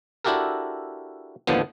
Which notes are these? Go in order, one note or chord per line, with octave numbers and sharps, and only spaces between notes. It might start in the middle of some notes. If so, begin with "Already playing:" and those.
D4 E4 F#4 G4 A4 A#4
D#2 A2 D3 F3 B3